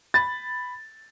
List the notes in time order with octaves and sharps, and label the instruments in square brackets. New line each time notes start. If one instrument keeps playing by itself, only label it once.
[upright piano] B5 A6